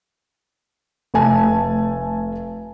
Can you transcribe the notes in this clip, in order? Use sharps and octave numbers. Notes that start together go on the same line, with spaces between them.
F1 A3 G#5 A5